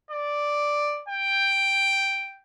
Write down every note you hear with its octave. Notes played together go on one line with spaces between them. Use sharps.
D5
G5